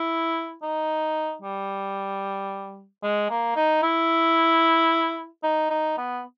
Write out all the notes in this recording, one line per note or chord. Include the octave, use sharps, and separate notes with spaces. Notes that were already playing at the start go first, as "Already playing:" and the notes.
Already playing: E4
D#4
G3
G#3
A#3
D#4
E4
D#4
D#4
B3